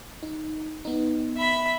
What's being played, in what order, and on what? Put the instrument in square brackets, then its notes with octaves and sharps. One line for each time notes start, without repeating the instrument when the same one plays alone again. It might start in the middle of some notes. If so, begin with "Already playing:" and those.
[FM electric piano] D#4
B3 D#4
[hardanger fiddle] E5 B5